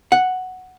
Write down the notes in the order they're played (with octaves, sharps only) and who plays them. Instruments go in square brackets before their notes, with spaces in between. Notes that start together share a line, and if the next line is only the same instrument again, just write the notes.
[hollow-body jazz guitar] F#5